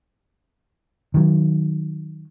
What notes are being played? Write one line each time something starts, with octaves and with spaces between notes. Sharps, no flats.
D#3 F#3